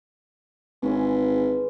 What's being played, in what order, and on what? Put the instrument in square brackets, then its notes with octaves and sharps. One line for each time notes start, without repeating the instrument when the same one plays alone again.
[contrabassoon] G#1 [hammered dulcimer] E3 G#3 C#4